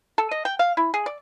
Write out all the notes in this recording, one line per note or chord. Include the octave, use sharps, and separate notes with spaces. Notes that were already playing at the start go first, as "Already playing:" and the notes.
A4
D#5
G5
F5
E4
G#4
D5